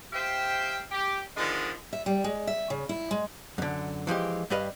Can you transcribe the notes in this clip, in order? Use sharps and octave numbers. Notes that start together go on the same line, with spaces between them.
G4 C5 E5 F5 G5
G4
D3 D#3 F3 G#3 B3 D4
E5
G3
G#3
E5
C#3
E4
G#3
F#2 D3
E3 F3 G#3 G4
G2 G3 B4 D#5 F5